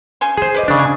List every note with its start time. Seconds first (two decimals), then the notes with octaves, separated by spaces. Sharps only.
0.21 C#3 G#5 C6
0.37 G#4 C5
0.55 B4 D5 D#5
0.68 C#3 D4
0.79 G#5